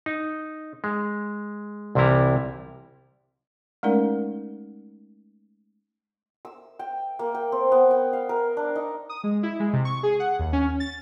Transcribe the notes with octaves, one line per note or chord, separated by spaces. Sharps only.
D#4
G#3
C2 C3 E3 G3 E4 A#5
G#3 A3 C#4 D#4 A#4 D5
E6
G5
A#3
G5
C4
B3
G5
F5
A#4
D4
D#4
D#6
G#3
E4
G#3
C3
C#6
G#4
F#5
D#2
C#4
A6